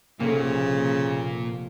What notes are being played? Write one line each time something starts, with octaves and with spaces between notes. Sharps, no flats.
F1 A#2 C#3 A#3